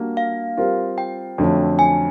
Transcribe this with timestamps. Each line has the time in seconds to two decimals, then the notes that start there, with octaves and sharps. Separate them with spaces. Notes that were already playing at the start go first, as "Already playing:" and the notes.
Already playing: G3 A#3 D4 F#4
0.17 F5
0.57 G3 C4 F4 A#4
0.98 G5
1.38 F2 D3 F#3 A3 C#4
1.79 G#5